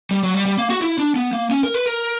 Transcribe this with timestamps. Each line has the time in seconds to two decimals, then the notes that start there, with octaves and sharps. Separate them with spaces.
0.11 G3
0.23 F#3
0.34 G3
0.46 G3
0.58 A#3
0.70 F#4
0.82 E4
0.98 D4
1.16 B3
1.33 A#3
1.51 C#4
1.63 A#4
1.74 B4
1.86 A#4